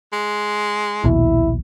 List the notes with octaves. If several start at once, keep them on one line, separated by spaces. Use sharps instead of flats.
G#3
A#1 D#2 B2 E4